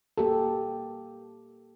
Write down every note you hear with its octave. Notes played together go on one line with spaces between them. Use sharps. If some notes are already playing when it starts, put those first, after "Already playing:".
A#3 G4 A4